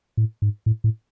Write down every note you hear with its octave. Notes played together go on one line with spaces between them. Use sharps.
A2
G#2
A2
A2